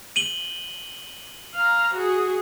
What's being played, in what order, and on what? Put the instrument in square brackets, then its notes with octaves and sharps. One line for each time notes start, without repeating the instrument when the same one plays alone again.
[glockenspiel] D#7 F#7 G7
[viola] F5 A#5
F#4 G#4